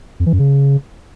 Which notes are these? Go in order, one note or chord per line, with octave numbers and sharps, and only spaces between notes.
F2
E3
F#2
C#3